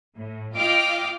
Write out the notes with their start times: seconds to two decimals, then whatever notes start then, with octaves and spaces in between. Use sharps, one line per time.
0.16 A2
0.55 F4 D#5 F5 G5 D6 F6